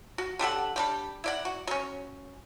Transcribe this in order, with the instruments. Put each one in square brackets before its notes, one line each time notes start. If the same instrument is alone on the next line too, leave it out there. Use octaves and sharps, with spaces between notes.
[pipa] F#4
D3 G4 A4 F#5
G3 D4 G4
E4 D5 F#5
F#4
F#3 C#4